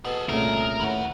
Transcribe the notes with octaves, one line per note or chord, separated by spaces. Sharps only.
B2 G#4 A4
C2 A#2 C#3 A3 A#4
D#2 A2 E4 C#5 F#5